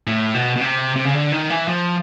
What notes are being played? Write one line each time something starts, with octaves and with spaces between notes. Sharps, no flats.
A2
B2
B2
C3
C3
C#3
D3
D#3
E3
F3